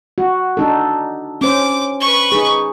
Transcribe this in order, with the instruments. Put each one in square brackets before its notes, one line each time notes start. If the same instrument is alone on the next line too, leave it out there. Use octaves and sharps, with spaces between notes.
[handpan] F#4
D4 D#4 A4
[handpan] C#4 C5 [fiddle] D6
[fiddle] B4 C#6
[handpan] D#4 G#4